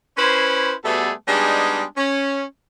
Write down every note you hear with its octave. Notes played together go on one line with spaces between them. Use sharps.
C#4 E4 B4 C5
B2 G3 A3 B3 G#4 A4
G3 G#3 B3 D4 D#4 G#4
C#4